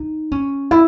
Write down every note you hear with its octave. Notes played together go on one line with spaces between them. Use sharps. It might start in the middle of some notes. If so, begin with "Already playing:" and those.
Already playing: D#4
C#4
E4